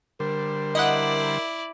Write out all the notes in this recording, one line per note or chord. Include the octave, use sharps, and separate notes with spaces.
D3 G3 A#4 C5
E4 D5 D#5 F#5